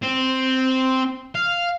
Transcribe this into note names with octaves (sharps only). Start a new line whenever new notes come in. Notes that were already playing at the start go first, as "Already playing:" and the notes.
C4
F5